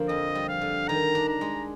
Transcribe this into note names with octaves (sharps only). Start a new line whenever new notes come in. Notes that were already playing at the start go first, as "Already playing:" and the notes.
Already playing: D3 F3 A#3
F2 D#5
G3
F5
D3
D#3 A#5
D4
A#5
G#3